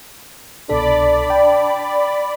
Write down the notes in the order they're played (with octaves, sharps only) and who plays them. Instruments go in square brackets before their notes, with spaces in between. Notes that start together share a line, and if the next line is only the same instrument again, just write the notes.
[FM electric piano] C2 B2 A4 [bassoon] D4 [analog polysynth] D5 B5
[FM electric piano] G5